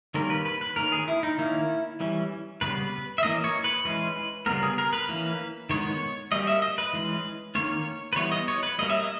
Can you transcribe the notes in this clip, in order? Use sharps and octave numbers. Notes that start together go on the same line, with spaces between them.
D#3 G3 A#3 C#4 A#4
B4
B4
B4
D#3 A#3 C#4 A#4
G#4
E4
D#4
D#3 A#3 C#4 E4
E3 G3 C#4
C#3 G3 B3 B4
E5
E3 A#3 C#4 D#5
C#5
B4
E3 G#3 C#4 B4
C#3 G3 B3 A#4
G#4
A#4
B4
E3 A#3 C#4
D#3 G#3 B3 C#5
G3 A#3 C#4 D#5
E5
D#5
B4
E3 G#3 C#4
D#3 A#3 C#4 C#5
B4
E3 G3 B3 C#5
D#5
C#5
B4
G3 A#3 C#4 D#5
E5
D#5